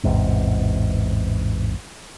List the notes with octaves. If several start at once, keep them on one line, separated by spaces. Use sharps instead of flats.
A1 E2 G#2 C3